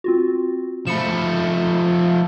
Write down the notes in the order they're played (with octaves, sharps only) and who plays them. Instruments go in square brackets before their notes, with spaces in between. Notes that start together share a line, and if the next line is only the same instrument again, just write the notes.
[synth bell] C4 F4 F#4
[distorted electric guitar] F3 A3 [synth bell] B5 C#7 E7